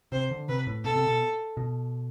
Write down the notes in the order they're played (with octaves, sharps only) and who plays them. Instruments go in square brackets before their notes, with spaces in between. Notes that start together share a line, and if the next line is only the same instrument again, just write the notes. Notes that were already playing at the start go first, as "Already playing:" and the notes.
[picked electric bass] C3 [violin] C5
[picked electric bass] D3
[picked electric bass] C3 [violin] B4
[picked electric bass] A2
[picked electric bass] B2 [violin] A4
[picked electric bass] C3
B2
B2